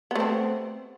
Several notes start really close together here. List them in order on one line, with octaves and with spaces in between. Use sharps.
B3 A3 C4